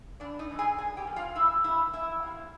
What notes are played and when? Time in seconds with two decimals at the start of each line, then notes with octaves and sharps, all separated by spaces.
0.20 E2 D4 D5
0.39 D#4 D#5
0.50 C3 E3 A3 C#4
0.59 G#4 G#5
0.78 A#2 G#4 G#5
0.97 G4 G5
1.07 F3 A#3 C#4
1.16 F4 F5
1.35 F2 E4 E5
1.64 C3 E3 E4 E5
1.93 E2 E4 E5
2.22 C3 F3